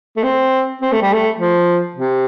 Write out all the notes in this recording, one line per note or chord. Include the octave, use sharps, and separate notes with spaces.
A3
C4
C4
A3
G3
A3
F3
C3